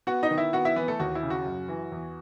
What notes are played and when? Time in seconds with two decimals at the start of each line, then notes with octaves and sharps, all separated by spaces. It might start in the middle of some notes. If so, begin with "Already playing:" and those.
0.07 B3 F#4 F#5
0.23 D#4 D#5
0.31 D#3
0.38 E4 E5
0.53 B3 F#4 F#5
0.65 E4 E5
0.76 E3 B3 B4
0.88 A3 A4
1.00 D#2 F#4
1.15 E4
1.23 C#3
1.30 F#4
1.45 F#2
1.68 E3
1.92 E2